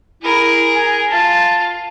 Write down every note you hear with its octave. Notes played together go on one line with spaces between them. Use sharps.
E4 G#4 A#4
G#5
F4 A5